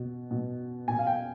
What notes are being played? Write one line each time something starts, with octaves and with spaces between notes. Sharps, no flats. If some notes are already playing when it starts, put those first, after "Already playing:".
Already playing: B2
B2
B2 G#5
F5
G5